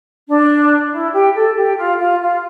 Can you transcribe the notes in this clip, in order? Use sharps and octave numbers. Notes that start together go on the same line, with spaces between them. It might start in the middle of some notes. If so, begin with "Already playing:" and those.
D4
E4
G4
A4
G4
F4
F4
F4